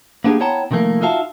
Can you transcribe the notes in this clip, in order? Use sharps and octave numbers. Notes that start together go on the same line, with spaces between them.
A#3 B3 D4 G4 G#4
B3 E4 C#5 G5 A5 A#5
C3 D#3 F3 A3 A#3
D#4 F4 F#4 E5 F5 A5